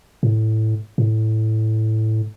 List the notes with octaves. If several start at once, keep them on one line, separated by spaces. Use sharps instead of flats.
A2
A2